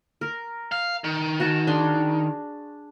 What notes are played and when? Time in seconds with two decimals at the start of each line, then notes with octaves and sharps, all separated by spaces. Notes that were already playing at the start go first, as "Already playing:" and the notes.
0.21 A#4
0.72 F5
1.04 D#3
1.40 F#4 G#5 A5
1.67 D4 G#4 C6